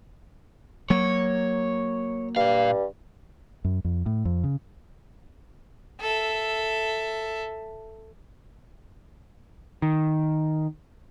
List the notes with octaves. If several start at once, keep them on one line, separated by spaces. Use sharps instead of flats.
F#3 A#3 C#5
G2 A#2 F5
F#2
F2
A2
F2
C#3
A4 E5
D#3